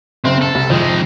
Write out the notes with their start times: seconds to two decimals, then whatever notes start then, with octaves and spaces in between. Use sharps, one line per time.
0.24 F#1 C4
0.41 A4
0.55 C2
0.70 F2 D#3 G#3